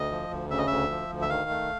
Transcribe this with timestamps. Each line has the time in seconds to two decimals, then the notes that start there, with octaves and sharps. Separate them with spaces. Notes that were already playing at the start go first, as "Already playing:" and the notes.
Already playing: D2 D#5
0.11 F3
0.31 D2
0.50 C#3 E5
0.58 D#5
0.67 D2 E5
0.90 F3
1.11 D2
1.22 E5
1.30 D#3 F5
1.50 A3